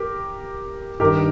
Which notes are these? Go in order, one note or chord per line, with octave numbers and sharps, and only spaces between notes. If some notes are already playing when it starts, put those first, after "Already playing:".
Already playing: G4 A#4
G2 D#3 G4 A#4